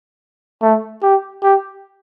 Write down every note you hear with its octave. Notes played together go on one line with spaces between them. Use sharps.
A3
G4
G4